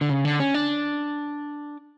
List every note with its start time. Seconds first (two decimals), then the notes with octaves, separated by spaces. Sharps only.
0.01 D3
0.09 C#3
0.25 D3
0.40 C#4
0.54 D4